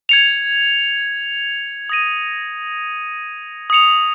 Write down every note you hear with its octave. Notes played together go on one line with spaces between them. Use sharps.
G#6 C#7 F7
D#6 A#6 D#7
D#6 C#7 F7